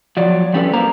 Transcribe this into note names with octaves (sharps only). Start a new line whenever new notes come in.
F3 F#3 D5
F3 G3 C#4 A4 B4
A#3 A#4 C5 A#5